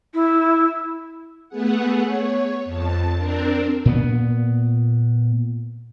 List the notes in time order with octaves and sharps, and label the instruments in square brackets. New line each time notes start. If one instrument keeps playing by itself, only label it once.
[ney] E4
[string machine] A3 B3 G#4 F#5
C#5
F2 A5
C4 D4 A#4
[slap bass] A#2 B3